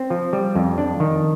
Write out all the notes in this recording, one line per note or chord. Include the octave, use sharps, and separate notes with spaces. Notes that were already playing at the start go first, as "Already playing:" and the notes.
Already playing: C4
F3
G3
F2
D4
D#3